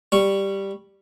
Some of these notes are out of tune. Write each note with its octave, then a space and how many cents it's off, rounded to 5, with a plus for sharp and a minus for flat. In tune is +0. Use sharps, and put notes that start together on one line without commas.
G3 +0 C#6 +0